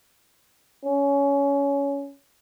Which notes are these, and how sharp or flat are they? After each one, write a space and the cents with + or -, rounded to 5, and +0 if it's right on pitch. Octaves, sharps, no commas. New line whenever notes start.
C#4 +20